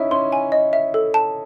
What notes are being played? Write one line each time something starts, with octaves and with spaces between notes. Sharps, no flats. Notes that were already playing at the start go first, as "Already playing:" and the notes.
Already playing: C#4 D#4 E4 E5
C#4 C6
G#5
D#5
E5
A4
A5